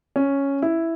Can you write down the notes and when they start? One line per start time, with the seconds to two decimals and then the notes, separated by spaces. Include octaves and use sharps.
0.16 C#4
0.62 E4